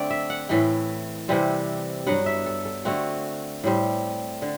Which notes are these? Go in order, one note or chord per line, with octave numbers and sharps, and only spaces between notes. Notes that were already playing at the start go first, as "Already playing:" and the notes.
Already playing: D3 A3 C4 D5
E5
F#5
A2 E3 A3 G5
C3 E3 G3 C4
G2 F#3 B3 F#5
E5
A4
A4
D3 A3 C4 F#4
A2 G3 C4
D3